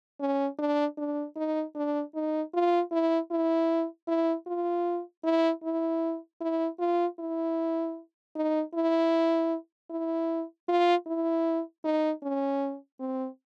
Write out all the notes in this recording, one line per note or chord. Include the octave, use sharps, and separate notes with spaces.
C#4
D4
D4
D#4
D4
D#4
F4
E4
E4
E4
F4
E4
E4
E4
F4
E4
D#4
E4
E4
F4
E4
D#4
C#4
C4